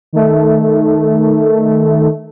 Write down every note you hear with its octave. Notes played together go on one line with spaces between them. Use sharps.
D#3 A3